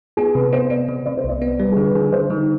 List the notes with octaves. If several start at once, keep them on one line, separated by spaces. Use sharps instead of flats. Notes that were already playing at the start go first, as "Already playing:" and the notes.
B3 G#4
C3 B4
B3 C5
B3 D5
C3
C3 D5
C5
C2 D5
B3
G3 B4
D3 G#4
B4
D3 G#4
D3 C5
D3 D#4